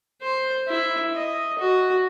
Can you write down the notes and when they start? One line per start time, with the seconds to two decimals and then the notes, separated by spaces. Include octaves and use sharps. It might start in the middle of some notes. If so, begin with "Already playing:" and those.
0.22 C5
0.68 E4
1.15 D#5
1.59 F#4